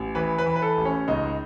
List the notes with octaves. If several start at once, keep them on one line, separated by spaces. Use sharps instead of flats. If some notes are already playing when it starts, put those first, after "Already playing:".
Already playing: A1
E3 B4
B4
E3
B4
A4
A1
C#4
C#2 D#4